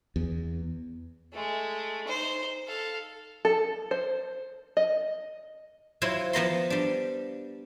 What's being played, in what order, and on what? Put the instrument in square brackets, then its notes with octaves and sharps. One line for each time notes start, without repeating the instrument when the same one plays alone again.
[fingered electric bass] E2
[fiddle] G#3 A3
D#4 C5
A4 F5
[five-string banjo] A4
C5
D#5
[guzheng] F#3 E4 F4 C5 C#5
F3 B3 A#5 C6
G3 D4